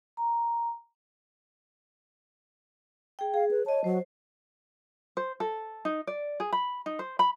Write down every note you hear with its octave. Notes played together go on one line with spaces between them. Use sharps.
A#5
G#4 G5
G#4 F5
B4
C#5 D#5 A5
F#3 C5
C5
A4
D#4
D5
G#4
B5
D#4
C5
B5